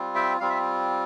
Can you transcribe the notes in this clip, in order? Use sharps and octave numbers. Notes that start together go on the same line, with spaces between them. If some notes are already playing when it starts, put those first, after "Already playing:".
Already playing: G3 C4 F4
E5 G5
G3 C4 F4 F5
E5